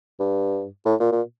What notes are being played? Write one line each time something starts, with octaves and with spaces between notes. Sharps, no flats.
G2
A2
A#2
A#2